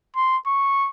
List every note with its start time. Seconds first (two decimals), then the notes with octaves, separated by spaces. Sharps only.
0.16 C6
0.47 C#6